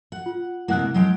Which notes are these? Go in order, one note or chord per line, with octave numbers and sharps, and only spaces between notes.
F#5
F4
C3 G#3 A#3 E4 F#5 F#6
F#3 G#3 G5